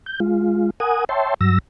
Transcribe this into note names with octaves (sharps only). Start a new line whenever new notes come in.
G6
G#3 F4
A#4 F#5 G#5 D#6
C#5 E5 G5 A5 C6
G2 F#3 E6 A#6